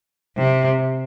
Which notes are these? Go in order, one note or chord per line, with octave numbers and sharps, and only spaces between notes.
C3